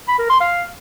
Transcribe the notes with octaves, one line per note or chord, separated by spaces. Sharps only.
B5
A#4
C6
F5